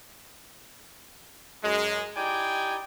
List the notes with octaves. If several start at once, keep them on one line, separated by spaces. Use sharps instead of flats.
F#2 G#3
D#4 E4 G4 D5 G5 G#5